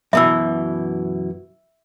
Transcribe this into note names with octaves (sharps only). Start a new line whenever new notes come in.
F#2 B2 E3 E5 E6